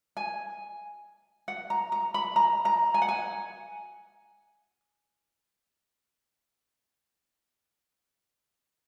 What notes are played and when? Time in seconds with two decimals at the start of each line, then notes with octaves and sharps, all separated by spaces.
0.17 G#5
1.48 F#5
1.70 A#5
1.92 A#5
2.14 B5
2.36 A#5
2.65 A#5
2.94 G#5
3.02 F#5
3.09 G#5